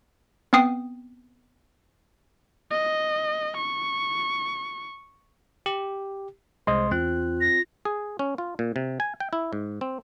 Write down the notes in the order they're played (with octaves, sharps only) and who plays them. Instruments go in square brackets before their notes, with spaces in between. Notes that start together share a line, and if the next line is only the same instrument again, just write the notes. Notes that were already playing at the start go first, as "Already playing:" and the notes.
[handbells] B3 C4 G5 D#6 C7
[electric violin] D#5
C#6
[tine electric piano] G4
[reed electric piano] C2 D#5 C6 [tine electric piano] G#3 [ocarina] C5
[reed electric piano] E2 F#6 [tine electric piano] C4 [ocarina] F4
[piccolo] A#6
[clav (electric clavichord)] G#4
C#4
F4
A#2
C3
G#5
G5
E4
G#2
C4